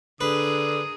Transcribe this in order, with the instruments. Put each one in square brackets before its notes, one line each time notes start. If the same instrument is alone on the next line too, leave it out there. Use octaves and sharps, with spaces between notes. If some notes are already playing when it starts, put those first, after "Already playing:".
[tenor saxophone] D3 [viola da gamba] D4 G#4 A#4 [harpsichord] B4 [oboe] D#6